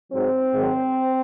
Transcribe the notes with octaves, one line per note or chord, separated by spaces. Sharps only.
G#2 F#3 C4
G#2 D#3 F#3